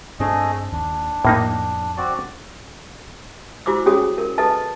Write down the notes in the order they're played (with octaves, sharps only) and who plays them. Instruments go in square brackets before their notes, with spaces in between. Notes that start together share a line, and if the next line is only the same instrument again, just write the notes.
[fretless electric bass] G2 C4 D4 [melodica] A3 G#4 D#5
[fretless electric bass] D#2 [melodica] D4
[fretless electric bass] F2 [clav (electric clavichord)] A2 A#3 D#4
[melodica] C4 F#4 D5
[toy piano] E4 F#4 C5 D6 E6
C#4 F#4 G#4 C#5 D#6
A#4
A4 B4 D#5 A5